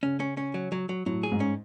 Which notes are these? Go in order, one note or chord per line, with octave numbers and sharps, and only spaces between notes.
C#3 C#4
C#4
C#4
F#3
F#3
F#3
A2 F#3
G#4
G#2
C#4